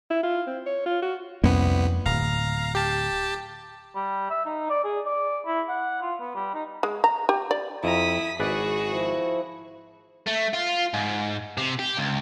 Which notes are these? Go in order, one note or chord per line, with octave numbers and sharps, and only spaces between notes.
E4
F4
C4
C#5
F4
F#4
C2 F2 A#3 B3 C#4
D1 F5 A#5
G4 A5
G3
E5
D#4
D5
G#4
D5
E4
F#5
F4
B3
G3
D#4
G#3
A#5
G4
D5
F2 E4 A#5 D#6 B6
G#1 F#4 G#4 B4 D5
F3 E4
A3
F4
G#2
C3
G4
C#2